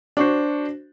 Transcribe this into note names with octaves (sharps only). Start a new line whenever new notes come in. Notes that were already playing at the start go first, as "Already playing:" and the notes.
D4 F#4 C5